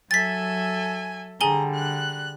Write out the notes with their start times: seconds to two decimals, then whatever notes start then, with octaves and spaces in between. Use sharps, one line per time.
0.11 F#3 A4 E5 G#5 A6 B6
1.41 D3 G3 G#4 G#5 A#5 G7
1.74 F#6